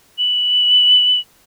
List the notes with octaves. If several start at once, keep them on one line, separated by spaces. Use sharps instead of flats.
F#7